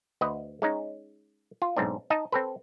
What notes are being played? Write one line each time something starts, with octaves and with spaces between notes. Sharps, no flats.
D2 B4 D#5
G#3 C#4 D#4
F4
B1 G#2 C4 D4
D#4 D#5 A5
C4 A4 B4